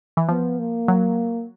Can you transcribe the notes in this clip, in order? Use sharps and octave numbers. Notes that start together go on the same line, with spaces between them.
E3
F3 B3
A#3
F#3